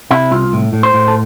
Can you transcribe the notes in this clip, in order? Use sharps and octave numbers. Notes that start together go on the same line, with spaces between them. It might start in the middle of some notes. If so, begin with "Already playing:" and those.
C3 E4
C2 F4
A2
A2
C5
A2
A4